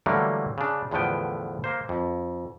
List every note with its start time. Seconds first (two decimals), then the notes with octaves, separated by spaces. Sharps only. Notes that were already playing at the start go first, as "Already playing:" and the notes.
0.06 D3 E3 F#3 G3 A3 A#3
0.58 C#3 D4
0.91 E2 A2 D3 F3 B3 G5
1.64 A#3 C5
1.89 F2